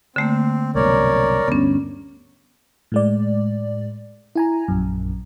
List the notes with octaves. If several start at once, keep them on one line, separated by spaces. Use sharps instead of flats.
D3 A3 A#3 C4
C2 F#2 B2 A#4 C#5 D5
D2 G2 B3 C#4
A2 G#3 D5
E4 G#5 A#5
A#1 F#2